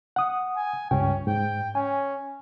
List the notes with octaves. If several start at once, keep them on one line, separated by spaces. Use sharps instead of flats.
F#5 D#6
G#5
C#2 G2 C#4 G5
G#2 G5
C#4 G#5